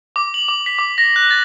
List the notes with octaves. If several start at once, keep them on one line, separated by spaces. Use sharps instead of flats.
D6
F#7
D6
B6
D6
A#6
F#6
A6